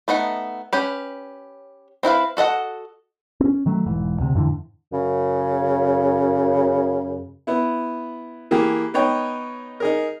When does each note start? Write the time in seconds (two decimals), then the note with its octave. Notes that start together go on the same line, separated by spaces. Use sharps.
0.08 A3 B3 D#4 F#5
0.73 C#4 G4 B4
2.03 C4 E4 B4 F5
2.37 F#4 A4 D#5 F#5
3.40 C4 C#4
3.66 D#3 F#3 A3
3.86 E1 G#2 E3
4.20 D2 C3
4.35 F2 G#2 D3 E3
4.92 F#2 C#3
7.47 B3 E4
8.51 E3 A#3 G4 G#4
8.94 B3 D#4 C#5 G5
9.80 D#4 G#4 A#4